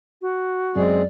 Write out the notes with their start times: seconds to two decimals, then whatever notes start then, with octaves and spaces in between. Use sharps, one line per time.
0.22 F#4
0.76 F#2 G#3 C4 G#4 D5